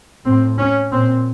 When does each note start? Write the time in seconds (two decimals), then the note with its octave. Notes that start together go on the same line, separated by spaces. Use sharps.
0.25 A2 C4
0.59 C#4
0.92 A#2 C4